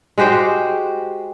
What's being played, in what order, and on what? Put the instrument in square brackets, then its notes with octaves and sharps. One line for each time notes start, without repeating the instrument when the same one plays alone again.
[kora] G#3 F#4 G4 C5